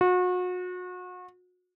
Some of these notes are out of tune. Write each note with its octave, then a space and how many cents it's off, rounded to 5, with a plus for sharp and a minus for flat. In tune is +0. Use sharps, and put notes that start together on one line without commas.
F#4 -35